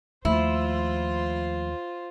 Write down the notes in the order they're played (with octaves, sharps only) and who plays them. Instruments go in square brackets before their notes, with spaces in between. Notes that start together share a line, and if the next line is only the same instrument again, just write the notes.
[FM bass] D#2 [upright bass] F3 A3 [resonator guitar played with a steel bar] E4 [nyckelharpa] F4 C5